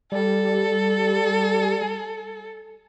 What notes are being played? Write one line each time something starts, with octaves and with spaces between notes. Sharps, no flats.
G3 A4